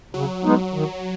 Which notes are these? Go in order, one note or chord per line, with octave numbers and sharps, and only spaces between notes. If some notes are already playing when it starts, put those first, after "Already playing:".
C#3 F#3
G#3 B3 D#4
D#3